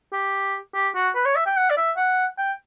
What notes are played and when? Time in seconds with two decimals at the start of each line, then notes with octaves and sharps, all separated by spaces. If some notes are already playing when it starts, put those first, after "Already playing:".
0.13 G4
0.74 G4
0.95 F#4
1.15 B4
1.26 C#5
1.36 E5
1.46 G5
1.57 F#5
1.70 D5
1.77 E5
1.97 F#5
2.38 G5